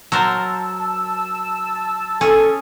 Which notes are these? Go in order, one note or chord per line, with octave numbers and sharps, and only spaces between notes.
F#3 A#4 C5 A5 E6
C#4 G#4 A4